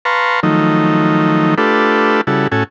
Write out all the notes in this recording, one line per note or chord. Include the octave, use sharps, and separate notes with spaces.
B4 F5 A5 A#5 C6 C#6
D#3 F3 F#3 A3 D#4
A3 D4 F4 G4 A4 B4
C#3 G3 E4 F#4 A4
A2 C#4 F#4 A4 G#5